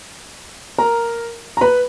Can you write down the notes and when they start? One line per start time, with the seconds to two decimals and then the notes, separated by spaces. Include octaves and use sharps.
0.78 A#4 A#5
1.57 A#5
1.61 B4 B5